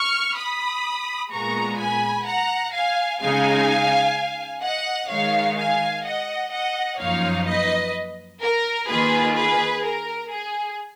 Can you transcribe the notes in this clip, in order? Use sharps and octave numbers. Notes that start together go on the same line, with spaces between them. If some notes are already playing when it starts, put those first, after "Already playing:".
Already playing: C#6 F6
B5 D#6
A#2 G#3 B3 A#5 C#6
G#5 B5
F#5 A#5
F5 G#5
C#3 G#3 D#4 F5 G#5
D#5 F#5
D#3 G#3 D#4 C#5 F5
F5 G#5
D#5 F#5
D#5 F#5
F#2 F3 A#3 D#4 C#5 F5
B4 D#5
A#4
D#3 A#3 F4 G#4 B4
G#4 B4
A#4
G#4